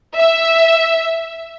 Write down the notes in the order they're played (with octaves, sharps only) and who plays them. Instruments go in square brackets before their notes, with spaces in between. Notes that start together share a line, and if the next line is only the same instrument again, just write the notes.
[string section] E5